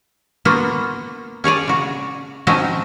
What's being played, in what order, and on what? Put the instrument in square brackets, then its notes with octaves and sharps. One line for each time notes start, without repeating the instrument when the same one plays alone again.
[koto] A#3 B3 F4 F#4
C#4 G#4 C#5 D5
C#3 F#4
F3 C4 C#4 D#4 F#4